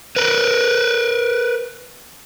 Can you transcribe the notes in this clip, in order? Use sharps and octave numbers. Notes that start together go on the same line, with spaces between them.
A#4 B4